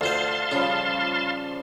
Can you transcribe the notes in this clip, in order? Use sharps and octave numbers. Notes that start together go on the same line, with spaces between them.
D2 F4 C5 F5 A5 C6
C#3 F3 G3 F4